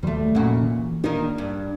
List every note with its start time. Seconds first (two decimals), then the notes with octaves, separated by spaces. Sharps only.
0.03 D#2 F#3 G3 A3
0.35 F1 A#2 C#4 F#4
0.63 E3
1.04 D#3 A#3 D4 D#4
1.38 G2